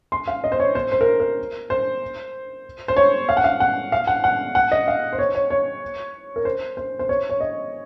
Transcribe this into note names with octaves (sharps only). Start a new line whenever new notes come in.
C6
F5
D#5
C5
C#5
C5
C5
A#4
A#4
C5
C5
C#5
F5
F#5
F5
F#5
F5
F#5
F#5
F#5
D#5
F5
C5
C#5
C#5
C#5
A#4
C5
C5
C5
C#5
C#5
D#5